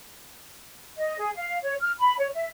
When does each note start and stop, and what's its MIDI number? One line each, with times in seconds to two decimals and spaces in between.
0.98 1.16 75
1.18 1.31 68
1.36 1.57 77
1.62 1.74 73
1.82 1.92 89
1.99 2.17 83
2.18 2.28 73
2.33 2.46 76